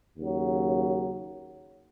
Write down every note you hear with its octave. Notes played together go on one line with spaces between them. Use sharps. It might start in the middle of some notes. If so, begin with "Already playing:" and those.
D#2 C#3 F#3